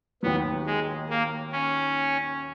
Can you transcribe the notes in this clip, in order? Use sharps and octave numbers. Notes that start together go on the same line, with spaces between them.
D#2 D#3 F#3 B3
G#3
A#3
C#4